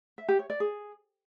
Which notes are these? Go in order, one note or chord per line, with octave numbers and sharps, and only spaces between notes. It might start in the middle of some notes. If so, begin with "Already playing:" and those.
E5
G4
C#5
D5
G#4